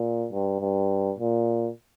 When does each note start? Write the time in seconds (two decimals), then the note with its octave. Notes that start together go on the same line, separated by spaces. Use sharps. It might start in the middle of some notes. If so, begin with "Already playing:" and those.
Already playing: A#2
0.32 G2
0.60 G2
1.18 A#2